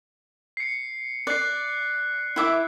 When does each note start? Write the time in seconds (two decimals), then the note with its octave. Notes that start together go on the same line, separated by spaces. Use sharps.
0.57 C7 C#7
1.27 D5 F#6 C7
2.36 E4 E5 D6